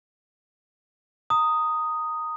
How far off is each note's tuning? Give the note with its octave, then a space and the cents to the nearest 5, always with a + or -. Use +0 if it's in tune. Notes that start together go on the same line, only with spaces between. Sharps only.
A#5 -20 D#6 +0